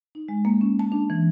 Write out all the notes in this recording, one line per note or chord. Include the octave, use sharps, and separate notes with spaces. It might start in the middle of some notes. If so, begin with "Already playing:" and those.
D#4
G#3
A#3
C#4
A5
D4
E3